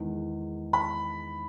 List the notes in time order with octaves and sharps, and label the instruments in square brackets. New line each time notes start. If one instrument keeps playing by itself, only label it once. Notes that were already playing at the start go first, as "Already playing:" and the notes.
Already playing: [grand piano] E2 D#3 G#3 D#4
[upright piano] B5